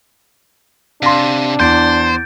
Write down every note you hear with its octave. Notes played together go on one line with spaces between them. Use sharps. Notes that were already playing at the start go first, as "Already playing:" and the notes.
C3 D4 F5 C6
E2 C5 G6 A6 D7